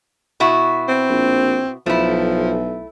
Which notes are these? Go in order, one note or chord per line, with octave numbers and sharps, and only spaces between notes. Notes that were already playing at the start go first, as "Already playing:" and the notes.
B2 E4 F#4
C4
A#1
B1 F3 A3 E4